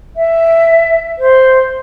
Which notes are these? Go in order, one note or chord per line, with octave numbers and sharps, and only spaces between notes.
E5
C5